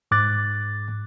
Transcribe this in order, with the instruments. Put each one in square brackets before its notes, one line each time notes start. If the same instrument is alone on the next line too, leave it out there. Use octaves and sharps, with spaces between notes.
[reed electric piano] G#2 D6 F#6 A6